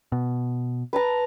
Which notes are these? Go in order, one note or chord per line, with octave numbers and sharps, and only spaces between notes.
B2
B4 A5 A#5